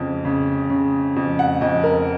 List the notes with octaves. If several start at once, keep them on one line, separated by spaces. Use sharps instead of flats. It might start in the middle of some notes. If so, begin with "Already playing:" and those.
Already playing: F2 C#3
C#3
C#3
F2
F#5
F2 D#5
A#4